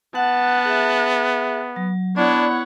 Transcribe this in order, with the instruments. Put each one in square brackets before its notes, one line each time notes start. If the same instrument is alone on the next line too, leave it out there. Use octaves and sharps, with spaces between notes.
[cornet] B3 [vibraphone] F#5 [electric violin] A5 F#6
[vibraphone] G#4 E5
F#3
[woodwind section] B3 E4 [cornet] D4 [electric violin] C#5 F#5 [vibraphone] D5